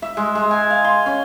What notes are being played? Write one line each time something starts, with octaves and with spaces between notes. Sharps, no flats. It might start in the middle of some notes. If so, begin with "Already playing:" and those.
E5
G#3
G#3
G#5
F5
C6
C#4